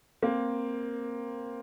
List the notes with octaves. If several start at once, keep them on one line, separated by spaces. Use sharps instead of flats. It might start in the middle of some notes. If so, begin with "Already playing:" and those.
A#3 C4